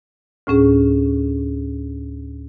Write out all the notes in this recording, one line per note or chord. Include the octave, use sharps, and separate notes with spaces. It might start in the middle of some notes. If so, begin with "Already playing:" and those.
D2 A2 C#4 G#4